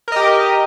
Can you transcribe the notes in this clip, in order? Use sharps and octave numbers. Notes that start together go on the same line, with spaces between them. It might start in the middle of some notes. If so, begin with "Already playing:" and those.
G4 A#4 D#5